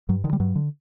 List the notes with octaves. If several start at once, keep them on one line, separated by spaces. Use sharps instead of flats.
G2 F#3
D3 D#3
G3
G2 F#3
D3